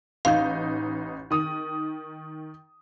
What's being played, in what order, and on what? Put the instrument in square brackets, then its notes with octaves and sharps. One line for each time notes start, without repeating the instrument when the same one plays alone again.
[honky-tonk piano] A1 D#4 G6 [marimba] F5
[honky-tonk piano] D#3 D#6